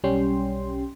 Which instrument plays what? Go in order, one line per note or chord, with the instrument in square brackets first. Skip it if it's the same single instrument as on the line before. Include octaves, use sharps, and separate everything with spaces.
[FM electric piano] B1 G3 C#4 G5 C6